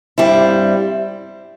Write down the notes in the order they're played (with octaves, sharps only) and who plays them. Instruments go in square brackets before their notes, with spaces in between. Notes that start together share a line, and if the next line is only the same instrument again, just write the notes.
[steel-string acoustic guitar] G2 G3 C4 E4